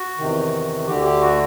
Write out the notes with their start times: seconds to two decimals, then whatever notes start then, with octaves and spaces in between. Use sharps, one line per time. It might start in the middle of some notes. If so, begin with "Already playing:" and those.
Already playing: F#4
0.18 E2 C3 D#3
0.87 D2 D3 G4
1.05 G4
1.21 F#4